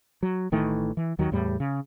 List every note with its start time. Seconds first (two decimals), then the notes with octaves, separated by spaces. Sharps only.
0.23 F#3
0.52 A1 D#3 E3 A3
0.97 E3
1.19 D#2 D#3 F#3
1.32 E2 A2 G3
1.60 C#3